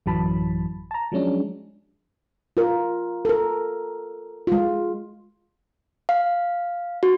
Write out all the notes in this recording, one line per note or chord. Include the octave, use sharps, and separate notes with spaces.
A1 F#2 E3 F#3 A5 B5
A5 A#5
F3 F#3 G#3 C#4 D4
F4 A#4
A4 A#4
G#3 F4
F5
F#4